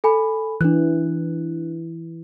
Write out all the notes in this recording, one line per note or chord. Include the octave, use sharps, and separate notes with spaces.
A4 G#5 B5
E3 D4 F#6